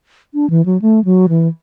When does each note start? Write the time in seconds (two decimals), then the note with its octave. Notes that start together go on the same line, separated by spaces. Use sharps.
0.34 D4
0.50 E3
0.65 F#3
0.81 A3
1.05 F#3
1.29 E3